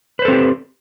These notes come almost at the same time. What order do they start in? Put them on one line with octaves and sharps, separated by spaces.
B4 C5 A4 C4 G4